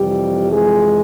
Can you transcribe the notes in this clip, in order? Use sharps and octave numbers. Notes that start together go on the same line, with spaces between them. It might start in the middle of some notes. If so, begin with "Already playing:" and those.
Already playing: F2 C3 E3 G3 G4
G#3 G#4